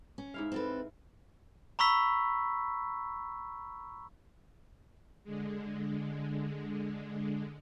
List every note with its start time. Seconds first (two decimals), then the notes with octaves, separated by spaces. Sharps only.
0.18 C#4
0.34 G#2 E4 F5
0.52 C4 A4 B4
1.79 A#5 B5 C#6 E6 B6
5.24 D3 G#3